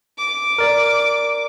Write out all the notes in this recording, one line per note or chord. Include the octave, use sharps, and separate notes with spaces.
D6
A#4 D5